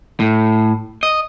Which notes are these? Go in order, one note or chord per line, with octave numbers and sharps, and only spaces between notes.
A2
D#5